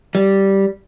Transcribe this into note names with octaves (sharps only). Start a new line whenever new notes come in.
G3